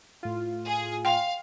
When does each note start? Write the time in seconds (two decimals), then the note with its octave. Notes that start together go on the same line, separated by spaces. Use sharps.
0.23 A2 F4
0.66 G#4
1.05 F5 G5 C6